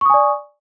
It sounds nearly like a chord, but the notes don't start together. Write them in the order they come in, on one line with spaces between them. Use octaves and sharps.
C#6 D#6 G#5 D5